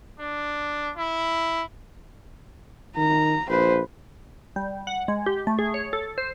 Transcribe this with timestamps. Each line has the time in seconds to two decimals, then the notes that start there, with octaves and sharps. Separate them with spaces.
0.19 D4
0.97 E4
2.97 D#3 A#5
3.50 A#1 B4 C5
4.56 G3
4.87 F#5
5.08 G#3
5.26 G4
5.47 A3
5.59 G#4
5.74 C#5
5.93 A4
6.18 C5